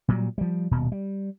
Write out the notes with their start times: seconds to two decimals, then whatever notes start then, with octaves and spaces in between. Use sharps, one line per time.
0.08 A#2 F#3 G3
0.38 F3 G3
0.71 D#1 B2
0.92 G3